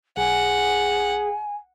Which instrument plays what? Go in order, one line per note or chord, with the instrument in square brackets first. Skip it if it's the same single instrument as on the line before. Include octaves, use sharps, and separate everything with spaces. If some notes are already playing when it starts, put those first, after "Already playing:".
[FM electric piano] B1 [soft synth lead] G#4 [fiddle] F#5 [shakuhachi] G#5